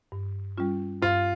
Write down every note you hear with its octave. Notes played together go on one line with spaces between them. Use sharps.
G2
G3 C#4 F4
G2 F4